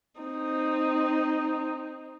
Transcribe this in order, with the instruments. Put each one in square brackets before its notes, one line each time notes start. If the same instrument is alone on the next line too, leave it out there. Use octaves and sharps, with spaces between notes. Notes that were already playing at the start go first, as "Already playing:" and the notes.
[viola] C4 D#4